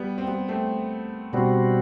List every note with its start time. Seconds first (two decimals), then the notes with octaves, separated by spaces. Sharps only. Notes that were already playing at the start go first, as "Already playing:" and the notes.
Already playing: G3 B3
0.18 C4
0.27 G3 B3
0.48 A3 C4
1.33 B2 G3 B3 C4 D4 F#4